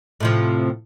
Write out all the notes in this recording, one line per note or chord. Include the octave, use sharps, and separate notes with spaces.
A2 C3 F3